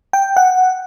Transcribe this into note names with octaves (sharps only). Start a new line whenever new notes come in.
G5
F#5